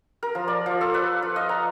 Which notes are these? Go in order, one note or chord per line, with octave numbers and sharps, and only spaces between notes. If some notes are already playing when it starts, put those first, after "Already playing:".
A#4
F3
D5
F3
A4
B4
F4
D#5
A#5